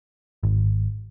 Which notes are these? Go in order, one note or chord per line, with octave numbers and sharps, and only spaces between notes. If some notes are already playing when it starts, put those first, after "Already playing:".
G#1